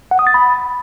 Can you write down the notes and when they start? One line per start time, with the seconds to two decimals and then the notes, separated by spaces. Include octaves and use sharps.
0.11 F#5
0.19 D#6
0.27 A6
0.34 B5